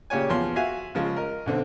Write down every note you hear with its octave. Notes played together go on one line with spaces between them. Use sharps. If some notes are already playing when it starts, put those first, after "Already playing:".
A#2 C#3 G4 C#5 G#5
E2 F3 C6
F#4 E5 F5 G#5
C#3 F3 G#3
A#4 D#5
B1 D3 C4